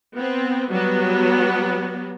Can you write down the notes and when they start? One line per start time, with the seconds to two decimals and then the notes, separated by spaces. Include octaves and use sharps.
0.15 B3 C4
0.70 F#3 G3 B3